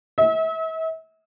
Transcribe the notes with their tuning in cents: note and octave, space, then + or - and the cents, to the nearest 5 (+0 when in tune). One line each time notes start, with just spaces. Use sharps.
E5 -40